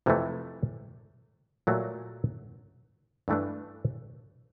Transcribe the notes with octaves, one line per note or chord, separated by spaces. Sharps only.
F2 C3 E3 A3
A#2 F#3 A3
G2 E3 A3 D4